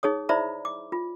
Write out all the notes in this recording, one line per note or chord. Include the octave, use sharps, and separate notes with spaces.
D#4 G#4 C#5 D#6
E4 C5 D5 E5 A#5 B5
D6
F4